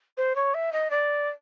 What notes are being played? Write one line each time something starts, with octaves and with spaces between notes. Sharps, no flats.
C5
C#5
E5
D#5
D5